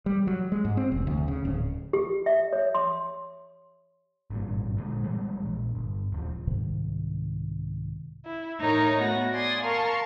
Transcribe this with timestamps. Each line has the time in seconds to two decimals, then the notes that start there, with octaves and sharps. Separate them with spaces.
0.06 G3
0.27 F#3
0.52 G#3
0.65 G#2
0.77 C4
0.92 F1
1.07 D2
1.28 C#3
1.45 D1
1.93 G4
2.26 E5
2.53 C#5
2.75 C6
4.30 G#1 G2 A#2
4.77 A#2 D3 G#3
5.04 E3 F3 G3 G#3
5.42 D#1 A#1
5.75 G1
6.12 D#1 C#2 F3
6.47 C2 G#2 C3 D#3
8.25 E4
8.60 A2 A3 D#4 A#4 C#5 A#5
9.01 A3 B3 F#4 A#6
9.33 D5 G#5 C6 D#6
9.63 A#4 F5 A5 C6 C#6